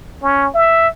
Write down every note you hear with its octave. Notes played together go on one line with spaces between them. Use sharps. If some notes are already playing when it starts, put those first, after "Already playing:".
C#4
E5